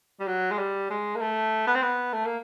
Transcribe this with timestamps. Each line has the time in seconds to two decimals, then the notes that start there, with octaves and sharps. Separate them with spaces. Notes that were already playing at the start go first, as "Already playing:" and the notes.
0.20 G3
0.27 F#3
0.51 G#3
0.58 G3
0.90 G#3
1.15 A#3
1.21 A3
1.67 B3
1.75 C4
1.82 B3
2.13 A3
2.25 A#3